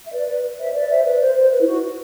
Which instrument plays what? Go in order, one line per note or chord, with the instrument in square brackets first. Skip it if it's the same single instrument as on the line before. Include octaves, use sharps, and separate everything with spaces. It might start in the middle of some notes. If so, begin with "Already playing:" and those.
[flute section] E5
B4 D5
B4
C5 E5
B4 D5
C5 E5
B4 D5
C5
C5
B4
E4
F#4